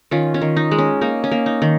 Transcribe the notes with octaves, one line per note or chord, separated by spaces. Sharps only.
D#3 C#4 F4
C#4
D#3
D#4
G#3
C#4
A#3 D#4
C#4
A#3
D#4
D#3